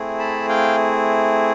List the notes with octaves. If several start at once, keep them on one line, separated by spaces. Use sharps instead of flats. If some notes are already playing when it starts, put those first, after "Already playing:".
Already playing: A3 C4 E4 G#4
A5 B5
F5 G5